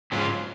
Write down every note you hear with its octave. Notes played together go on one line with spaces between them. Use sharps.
G#2 F#3 C#4 F4